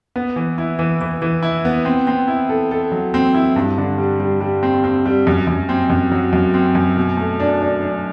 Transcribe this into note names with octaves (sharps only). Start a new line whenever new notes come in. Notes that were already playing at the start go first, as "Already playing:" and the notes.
B3
E3
E4
E3
E3
E3
E4
B3
C4
C4
E4
A4
A4
F#3
C4
E4
G2
D3
G3
G3
G3
C4
C4
G3
F#2
F#2
C4
F#2
F#3
F#2
C4
F#2
B2
A3
D4
D4
D4